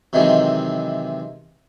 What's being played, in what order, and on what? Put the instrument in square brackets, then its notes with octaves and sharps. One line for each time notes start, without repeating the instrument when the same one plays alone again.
[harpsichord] C3 D#3 E3 F#3 G#3 C4